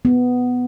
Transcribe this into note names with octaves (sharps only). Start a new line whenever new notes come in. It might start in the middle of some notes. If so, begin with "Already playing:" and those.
B3